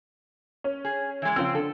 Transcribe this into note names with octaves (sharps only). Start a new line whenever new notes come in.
C#4
G#4
E3 G#3
C#3 F3 C4 E6
D3 A4